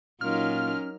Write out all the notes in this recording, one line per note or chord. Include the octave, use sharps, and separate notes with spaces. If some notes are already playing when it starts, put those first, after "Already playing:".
A#2 F#3 C#4 D#4 F4 A#4 F6